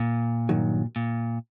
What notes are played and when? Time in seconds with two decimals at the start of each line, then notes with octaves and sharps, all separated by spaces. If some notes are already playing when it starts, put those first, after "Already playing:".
Already playing: A#2
0.49 G2 D#3 F#3
0.96 A#2